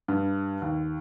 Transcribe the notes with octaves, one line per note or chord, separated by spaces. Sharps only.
G2
D#2